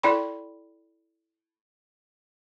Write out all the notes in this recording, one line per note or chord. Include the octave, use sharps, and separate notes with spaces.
E4 A4 D5 G5 B5 C6